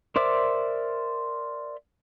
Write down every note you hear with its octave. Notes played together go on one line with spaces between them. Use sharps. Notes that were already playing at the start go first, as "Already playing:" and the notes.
A#4 C5 D5 E5 D6